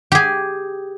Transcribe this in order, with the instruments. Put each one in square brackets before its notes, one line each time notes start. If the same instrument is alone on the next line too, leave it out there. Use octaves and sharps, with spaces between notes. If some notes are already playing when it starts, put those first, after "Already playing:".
[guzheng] G4 G#4